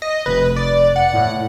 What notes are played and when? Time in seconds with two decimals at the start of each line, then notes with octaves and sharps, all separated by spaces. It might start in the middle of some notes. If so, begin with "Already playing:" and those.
0.02 D#5
0.26 F1 B4
0.56 D5
0.96 F#5
1.13 A2